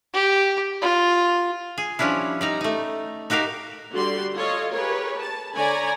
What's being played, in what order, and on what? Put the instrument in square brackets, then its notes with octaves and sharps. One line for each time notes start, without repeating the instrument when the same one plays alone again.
[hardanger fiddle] G4
F4
[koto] G#4
F3 G3 C#4 D4 E4
G3 D#4 A#5
A3 D#4
D#4 F#4 G4 A#4 F5
[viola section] D3 G3 F#4 G4 D5 C6
F4 A4 C#5 D#5 F5
G4 G#4 A#4 B4 C#5
A5
D3 C#5 D5 G#5 A#5 B5